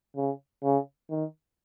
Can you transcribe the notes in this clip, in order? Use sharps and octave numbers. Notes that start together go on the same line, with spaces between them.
C#3
C#3
D#3